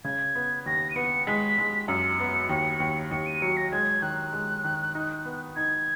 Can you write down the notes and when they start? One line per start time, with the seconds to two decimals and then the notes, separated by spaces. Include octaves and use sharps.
0.04 C#3 G#6
0.35 B3
0.66 D#2 A#6
0.91 D#7
0.96 B3 C#7
1.27 G#3 B6
1.58 G#3
1.88 F#2 C#7
2.20 B3
2.49 D#2
2.80 D#2
3.11 D#2 C#7
3.26 D#7
3.42 F#3 C#7
3.57 A#6
3.72 G#3 G#6
4.02 D#3 F#6
4.33 G#3
4.64 D#3
4.95 D#4
5.26 B3
5.56 D#4 G#6